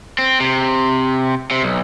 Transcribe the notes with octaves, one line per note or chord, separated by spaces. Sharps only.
C4
C3
C3
B1